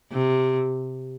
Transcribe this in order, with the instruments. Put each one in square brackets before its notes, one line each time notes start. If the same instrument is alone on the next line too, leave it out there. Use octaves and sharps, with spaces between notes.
[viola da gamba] C3